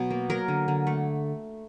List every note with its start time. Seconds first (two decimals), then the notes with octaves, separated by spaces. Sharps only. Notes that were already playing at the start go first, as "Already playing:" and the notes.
Already playing: B2 F#3
0.11 A#3
0.30 F#3 A#4
0.48 D3
0.68 D3
0.87 A3